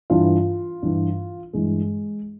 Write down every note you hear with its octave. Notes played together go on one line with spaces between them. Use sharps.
G2 E3 F4
G2 E3
G2 E3 G#3